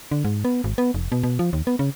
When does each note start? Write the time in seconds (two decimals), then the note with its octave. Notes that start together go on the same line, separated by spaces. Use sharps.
0.11 D3
0.25 G#2
0.45 B3
0.64 G#1
0.78 B3
0.94 F1
1.12 B2
1.23 B2
1.39 F3
1.53 D#2
1.67 B3
1.79 C#3